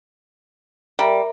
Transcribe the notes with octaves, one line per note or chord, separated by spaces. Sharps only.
G3 A#4 E5 A#5